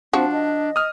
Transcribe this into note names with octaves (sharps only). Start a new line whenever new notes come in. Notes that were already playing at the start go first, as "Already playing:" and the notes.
F3 C4 D4 F#4
D#5
D#6 F6